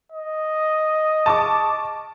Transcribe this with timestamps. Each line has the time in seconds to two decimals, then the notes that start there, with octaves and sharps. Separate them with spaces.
0.12 D#5
1.26 A5 C#6 D6